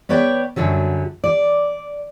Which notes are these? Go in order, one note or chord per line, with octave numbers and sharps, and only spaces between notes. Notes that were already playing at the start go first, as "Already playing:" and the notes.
B3 B4 C#5 D5 G5
F#2 D3 F#3 G3
D5